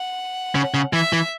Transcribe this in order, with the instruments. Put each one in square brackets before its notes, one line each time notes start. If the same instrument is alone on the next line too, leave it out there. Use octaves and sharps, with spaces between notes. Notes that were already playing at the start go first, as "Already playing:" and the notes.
Already playing: [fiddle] F#5
[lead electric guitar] C#3
C#3
[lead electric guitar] E3 [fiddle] E5
[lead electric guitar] E3